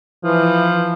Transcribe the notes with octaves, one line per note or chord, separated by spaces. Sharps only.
E3 F3